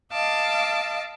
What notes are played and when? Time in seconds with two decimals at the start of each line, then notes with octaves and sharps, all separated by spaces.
0.12 D#5 F5 A5 D6 E6